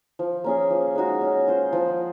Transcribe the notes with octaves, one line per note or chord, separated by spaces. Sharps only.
F3
A#3 C#4 G#4
F3
G#3 D#4 F#4
C#4
F4 C5
F3